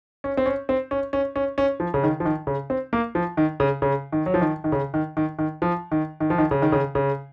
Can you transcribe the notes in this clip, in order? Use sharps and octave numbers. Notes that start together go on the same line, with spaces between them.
C#4
C4
C#4
C4
C#4
C#4
C#4
C#4
F3
C#3
D#3
F3
D#3
C#3
C4
A#3
F3
D#3
C#3
C#3
D#3
F#3
F3
D#3
D#3
C#3
D#3
D#3
D#3
F3
D#3
D#3
F3
D#3
C#3
D#3
C#3
C#3